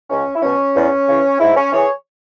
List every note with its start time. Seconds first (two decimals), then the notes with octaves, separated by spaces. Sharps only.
0.10 C#2 C#4
0.35 E4
0.42 B2 F#3 C#4
0.75 E2
1.08 C#3 E3
1.40 G#2 E4
1.57 C#4
1.72 E3 G#4 C#5